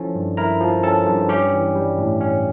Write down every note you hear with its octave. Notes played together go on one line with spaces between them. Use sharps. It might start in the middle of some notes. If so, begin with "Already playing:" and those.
Already playing: F3 C#4 E4 A4 A5
G2
E4 A#4 A#5
F3
C#4 A4 A5
G2
C#4 G4 G5
E3
G3
A2
C#4